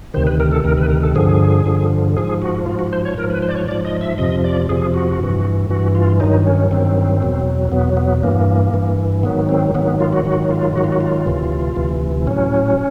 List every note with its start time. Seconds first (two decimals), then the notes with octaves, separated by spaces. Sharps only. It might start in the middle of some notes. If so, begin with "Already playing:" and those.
0.14 D2 C3 D#3 C5
0.27 B4
0.40 A#4
0.51 A4
0.64 D2 C3 D#3 A#4
0.78 B4
0.89 A#4
1.03 A4
1.15 G2 D3 F3 G#4
1.66 G2 D3 F3
2.16 G#2 F3 G#4
2.42 F#4
2.66 G#2 F3 F4
2.79 F#4
2.93 C5
3.05 C#5
3.17 G#2 F3 A#4
3.30 B4
3.42 C5
3.48 D5
3.55 C#5
3.68 G#2 F3 D5
3.85 D#5
4.01 E5
4.18 F2 C3 F3 D#5
4.44 D5
4.69 F2 C3 F3 G#4
4.94 F#4
5.20 G2 E3
5.70 G2 E3 F#4
5.95 F4
6.20 G2 D#3 F#3 D#4
6.46 C#4
6.71 G2 D#3 F#3 C4
7.21 E2 B2 F#3
7.72 E2 B2 F#3 B3
7.97 B3
8.23 G2 E3 A#3
8.74 G2 E3
9.23 G#2 D#3 F#3 B3
9.49 C4
9.75 G#2 D#3 F#3 B3
9.87 B3
10.00 F4
10.13 F#4
10.25 G#2 D#3 F#3 F#4
10.51 F4
10.75 G#2 D#3 F#3 F#4
10.84 F4
10.92 F#4
11.01 F4
11.26 D2 C3 E3
11.76 D2 C3 E3
12.27 A2 F#3 C#4